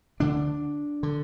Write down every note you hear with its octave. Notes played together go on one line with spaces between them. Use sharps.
D2 D3 D4
D3